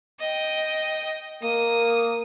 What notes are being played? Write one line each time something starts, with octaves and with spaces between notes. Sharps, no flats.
D#5 G5
A#3 D#6